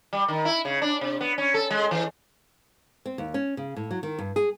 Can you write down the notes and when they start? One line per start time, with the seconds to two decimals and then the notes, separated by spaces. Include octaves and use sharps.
0.13 G3
0.28 D#3
0.45 E4
0.65 C#3
0.82 D4
1.01 C3
1.21 B3
1.38 C#4
1.54 A4
1.70 G#3
1.91 E3
3.06 C4
3.18 D#2
3.34 C#4
3.57 C#3
3.76 A2
3.91 F#3
4.03 D#3
4.18 G2
4.36 G#4